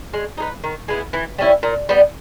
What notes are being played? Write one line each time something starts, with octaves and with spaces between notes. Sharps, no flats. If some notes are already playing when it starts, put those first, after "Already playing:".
G#3
D#4 G#4 B4
D#3
G#3 B3 E4
E3
G3 C#4 E4
A#2
G3 B3